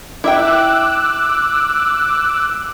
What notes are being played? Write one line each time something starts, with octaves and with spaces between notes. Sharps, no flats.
E4 E5 G5 D6 E6 F#6